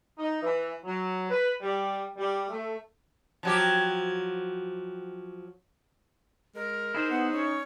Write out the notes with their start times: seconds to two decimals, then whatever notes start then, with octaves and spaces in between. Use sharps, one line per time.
0.18 D#4
0.43 E3
0.84 F#3
1.30 B4
1.62 G3
2.17 G3
2.49 A3
3.43 F3 F#3 G4
6.55 G#3 A#4
6.94 D#4 E4 G#4 C5
7.10 B3 F#5
7.32 C#4 C#5